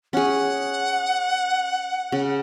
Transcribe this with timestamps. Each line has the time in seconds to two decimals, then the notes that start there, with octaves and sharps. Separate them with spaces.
0.13 C#4 G#4 F#5
2.12 C#3